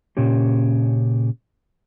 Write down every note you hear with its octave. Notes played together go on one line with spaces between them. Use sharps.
A#2 C#3 C#4 G4